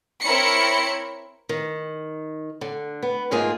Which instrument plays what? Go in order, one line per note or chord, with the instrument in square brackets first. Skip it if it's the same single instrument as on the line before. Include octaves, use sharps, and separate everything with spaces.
[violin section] C4 E4 A#4 C#5 B5 C#7
[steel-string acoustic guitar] D#3
D3
B3
D2 G#2 A#3 F4 G#4